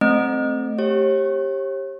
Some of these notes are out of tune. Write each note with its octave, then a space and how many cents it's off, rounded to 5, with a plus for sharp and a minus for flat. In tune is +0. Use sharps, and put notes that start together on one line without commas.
A3 +0 C4 +0 D#5 -20
G4 +0 C#5 -40